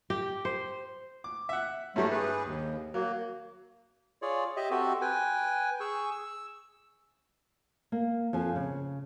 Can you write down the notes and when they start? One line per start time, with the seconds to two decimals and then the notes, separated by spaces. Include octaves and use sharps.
0.10 G4
0.45 C5
1.24 D6
1.49 E5 F#5
1.96 G2 E3 F#3 G3 A3
2.11 G#4 B4
2.44 D#2
2.94 F#3 A#3
4.22 F4 G#4 C#5 D5
4.57 G4 D#5 E5
4.71 C4 F#4 G4 A4
5.02 B4 G5 G#5
5.80 G#4 C#6 E6
6.12 E6
7.92 A#3
8.33 F2 F3 G#5
8.56 C#3